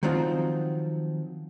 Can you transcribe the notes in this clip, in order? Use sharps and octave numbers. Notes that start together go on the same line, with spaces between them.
D#3 F3 F#3 C4 D#4 F4